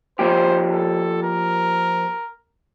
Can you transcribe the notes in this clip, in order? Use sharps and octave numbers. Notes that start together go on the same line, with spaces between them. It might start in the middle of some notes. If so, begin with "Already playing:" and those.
F3 A#3 G4 C5
A4
A#4